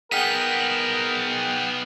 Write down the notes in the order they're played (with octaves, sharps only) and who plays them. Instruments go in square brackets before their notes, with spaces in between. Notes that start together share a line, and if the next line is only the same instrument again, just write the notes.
[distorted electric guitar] B3 D#4 [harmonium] G#4 F#5 G5 [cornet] A#4 [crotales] F6 B6